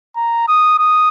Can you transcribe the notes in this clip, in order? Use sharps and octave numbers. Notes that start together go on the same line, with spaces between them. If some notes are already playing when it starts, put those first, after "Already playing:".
A#5
D#6
D#6